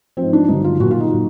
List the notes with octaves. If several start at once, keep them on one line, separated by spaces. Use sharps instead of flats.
G#2 F3 C4
D4
G2 D3 F#3 D#4
F4
A#2 F#3 F#4
F4
D#4
A#2 F#3